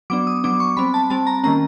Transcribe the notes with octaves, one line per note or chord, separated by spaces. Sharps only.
F#3 B3 D4 D6
D#6
F#3 B3 D4 D6
C#6
G3 C4 B5
A5
G3 C4 A5
A#5
D#3 G3 A#3 C#4 A#5